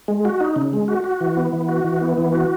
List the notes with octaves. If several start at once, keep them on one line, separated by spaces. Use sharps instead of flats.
G#3
F#4
D#4
C#3
G#3
F#4
F#4
E3
B3
E3
F#4
E3
B3
E3
F#4